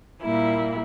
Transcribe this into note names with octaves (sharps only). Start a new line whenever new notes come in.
A#2 G3 A#3 E4